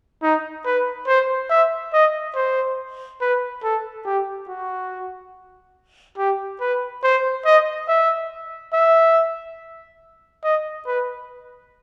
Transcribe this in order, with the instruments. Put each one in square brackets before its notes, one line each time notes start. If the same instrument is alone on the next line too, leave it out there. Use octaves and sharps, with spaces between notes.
[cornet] D#4
B4
C5
E5
D#5
C5
B4
A4
G4
F#4
G4
B4
C5
D#5
E5
E5
D#5
B4